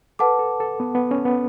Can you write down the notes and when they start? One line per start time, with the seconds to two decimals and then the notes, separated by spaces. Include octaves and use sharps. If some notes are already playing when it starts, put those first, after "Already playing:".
0.19 A4 B4 F#5 A5 D6
0.39 A4
0.60 A4
0.80 B3
0.95 B3
1.11 C#4
1.25 B3